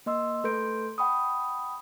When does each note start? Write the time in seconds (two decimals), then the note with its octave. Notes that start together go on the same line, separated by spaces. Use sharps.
0.06 A#3 D#5 C6 E6
0.44 A3 A4 B4 C6 G6 D7
0.98 F#5 G5 B5 C#6 D#6